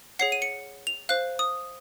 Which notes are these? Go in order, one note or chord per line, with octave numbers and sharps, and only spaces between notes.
G#4 C#5 F#5 C7
D#7
C#7
F7
C5 F5 F#6
D#6